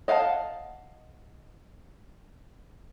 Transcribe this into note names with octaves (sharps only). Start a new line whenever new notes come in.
D#5 F5 F#5 G#5 A5